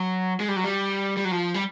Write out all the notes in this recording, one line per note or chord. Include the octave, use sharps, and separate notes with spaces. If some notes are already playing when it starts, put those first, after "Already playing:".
Already playing: F#3
G#3
G3
F#3
G3
G3
F#3
F3
G3